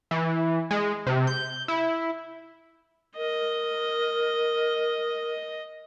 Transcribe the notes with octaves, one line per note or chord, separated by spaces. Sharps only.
E3
G#3
C3
G6
E4
A#4 D#5